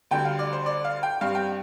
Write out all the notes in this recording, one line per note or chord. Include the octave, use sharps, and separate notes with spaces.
D2 D3 G3 G5
F5
D5
C5
D5
F5
G5
G2 G3 C4 F5
G5